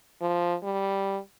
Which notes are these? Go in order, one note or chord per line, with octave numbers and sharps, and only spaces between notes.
F3
G3